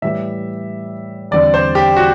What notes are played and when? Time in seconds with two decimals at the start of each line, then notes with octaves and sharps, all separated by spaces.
0.02 A2 E3 G3 E5
1.31 E2 D3 G3 C4 D5
1.54 C5
1.75 G4
1.97 F#4